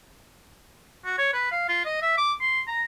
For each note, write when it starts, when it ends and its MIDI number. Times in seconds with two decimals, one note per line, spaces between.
1.05 1.18 66
1.18 1.29 73
1.34 1.48 71
1.52 1.69 77
1.69 1.81 65
1.85 1.98 75
2.02 2.14 76
2.17 2.33 86
2.41 2.61 84
2.67 2.82 82